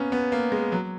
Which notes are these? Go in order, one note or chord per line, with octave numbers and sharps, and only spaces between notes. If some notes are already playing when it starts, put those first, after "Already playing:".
Already playing: A#3 B3 C#4
B3
A#3
G#3
F#3